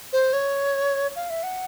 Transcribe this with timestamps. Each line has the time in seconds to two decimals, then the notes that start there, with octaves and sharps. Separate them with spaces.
0.13 C5
0.33 C#5
1.16 F5
1.30 E5
1.43 F#5